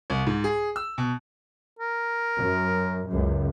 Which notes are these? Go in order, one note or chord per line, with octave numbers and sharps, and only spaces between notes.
C2
G#2
G#4
E6
B2
A#4
F#2
C#2 F#2